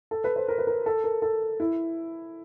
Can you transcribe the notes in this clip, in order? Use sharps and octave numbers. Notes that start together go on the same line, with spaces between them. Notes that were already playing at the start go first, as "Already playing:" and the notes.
A4
B4
C5
A#4
B4
A#4
A4
A#4
A4
E4